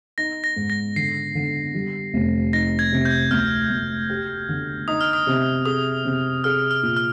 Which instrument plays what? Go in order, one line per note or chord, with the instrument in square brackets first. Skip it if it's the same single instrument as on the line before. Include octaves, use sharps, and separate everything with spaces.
[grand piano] D#4 [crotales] A#6
[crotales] A#6
[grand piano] G#2
[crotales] A#6
[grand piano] D3 [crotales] C7
[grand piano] D3
G3
F1
[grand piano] D#4 [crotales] A#6
[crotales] G#6
[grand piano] C3
[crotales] G6
[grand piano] D2 [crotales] F6
[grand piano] D2
G4
D3
[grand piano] D#4 [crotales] D#6
[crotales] F6
D#6
[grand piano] C3
[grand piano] G#4 [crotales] D#6
[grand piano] C3
[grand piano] G#4 [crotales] F6
[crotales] F6
[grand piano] A#2
[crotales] F6